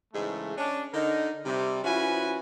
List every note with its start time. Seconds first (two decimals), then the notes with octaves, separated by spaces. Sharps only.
0.14 G#2 C#3 E3 G#3 A3
0.57 C#4 D4
0.93 D3 D#4 A#4
1.45 C3 G3
1.83 F3 C#4 E4 F#4 B4 G#5